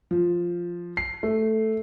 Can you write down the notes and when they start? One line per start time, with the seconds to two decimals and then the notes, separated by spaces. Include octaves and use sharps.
0.11 F3
0.97 C7
1.23 A3